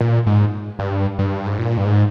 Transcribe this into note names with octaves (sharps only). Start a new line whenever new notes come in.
A#2
G#2
G2
G2
G#2
A#2
G2
G#2